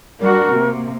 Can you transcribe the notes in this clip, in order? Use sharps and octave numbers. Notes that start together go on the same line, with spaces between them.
G3 D4 F#4 A#4
C3 A#3